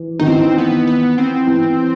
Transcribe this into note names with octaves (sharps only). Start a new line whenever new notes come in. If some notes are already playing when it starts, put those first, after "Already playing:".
Already playing: E3
D#3 D#4
E3 C4
B3
B3
C4
E3